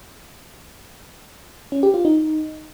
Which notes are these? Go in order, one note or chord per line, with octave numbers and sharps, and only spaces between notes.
C#4
G4
F4
D#4